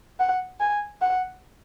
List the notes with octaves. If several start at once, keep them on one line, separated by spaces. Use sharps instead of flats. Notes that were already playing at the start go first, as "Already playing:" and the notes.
F#5
G#5
F#5